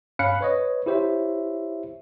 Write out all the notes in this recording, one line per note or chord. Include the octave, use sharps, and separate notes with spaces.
G2 C#4 F5 B5 F#6 C#7
B4 C#5 D#5
E4 G4 C5 C#5 E5